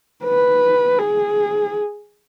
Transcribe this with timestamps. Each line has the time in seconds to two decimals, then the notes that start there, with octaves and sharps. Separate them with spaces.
0.24 B4
0.99 G#4